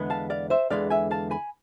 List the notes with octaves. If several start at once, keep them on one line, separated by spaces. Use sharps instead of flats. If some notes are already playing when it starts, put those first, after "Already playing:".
Already playing: E2 D3 G#3 B3
F5 A5
D5 F5
C5 E5
E2 D3 G#3 B3 D5 F5
E5 G#5
F5 A5
G#5 B5